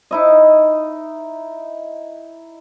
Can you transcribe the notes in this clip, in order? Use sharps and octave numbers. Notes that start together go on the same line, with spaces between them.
D#4 E4 D#5